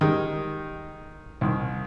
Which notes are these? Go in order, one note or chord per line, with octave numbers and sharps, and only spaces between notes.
D#3 G3 G#3
C2 D#3